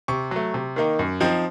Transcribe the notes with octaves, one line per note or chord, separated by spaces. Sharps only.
C3 C#6
F#3 A3
C3
D#3 A#3 D#4
F#2
F3 C4 D#4